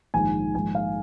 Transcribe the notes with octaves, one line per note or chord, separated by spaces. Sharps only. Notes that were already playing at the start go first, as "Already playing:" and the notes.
A#1 G#2 D#3 G#5
A#1 G#2 D#3 G#5
F5